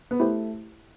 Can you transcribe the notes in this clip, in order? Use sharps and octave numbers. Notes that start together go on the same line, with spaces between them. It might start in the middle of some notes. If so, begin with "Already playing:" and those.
B3
A3 E4 G4 C5